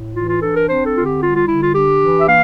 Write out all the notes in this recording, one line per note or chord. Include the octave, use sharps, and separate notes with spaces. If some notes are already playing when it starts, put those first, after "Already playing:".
Already playing: A2
E3 F4
F4
D4 A4
A#4
C4 C5
A4
D3 F4
G4
G3 F4
F4
D3 E4
F4
D4 G4
E3
E5
A#3 F5